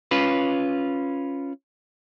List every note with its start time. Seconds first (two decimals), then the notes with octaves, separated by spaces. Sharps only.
0.11 C#4 F4 B4